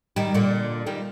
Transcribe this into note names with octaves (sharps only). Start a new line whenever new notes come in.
D#3 G3
A#2 D3
D#3 G3